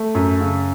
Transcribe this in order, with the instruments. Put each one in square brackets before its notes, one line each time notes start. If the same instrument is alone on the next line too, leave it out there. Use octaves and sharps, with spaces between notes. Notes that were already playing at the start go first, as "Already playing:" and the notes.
Already playing: [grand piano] A3
F#2
C#3